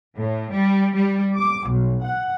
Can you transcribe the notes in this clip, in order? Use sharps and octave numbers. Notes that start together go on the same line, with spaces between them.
A2
G3
G3
D6
B1
F#5